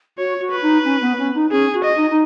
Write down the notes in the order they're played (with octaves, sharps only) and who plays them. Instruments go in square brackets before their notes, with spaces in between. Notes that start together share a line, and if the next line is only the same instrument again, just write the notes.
[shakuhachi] F#4 [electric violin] C#5
[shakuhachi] F#4
[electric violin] B4
[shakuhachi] D#4
C#4
B3
C#4
D#4
[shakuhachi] C#4 [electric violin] G#4
[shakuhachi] F#4
[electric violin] D#5
[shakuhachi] D#4
D#4